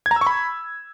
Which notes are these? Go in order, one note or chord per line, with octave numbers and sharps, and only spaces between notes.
G#6
A#5
E6
C#6
B5